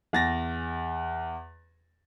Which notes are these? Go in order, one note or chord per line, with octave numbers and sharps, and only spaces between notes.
E2 A6 A#6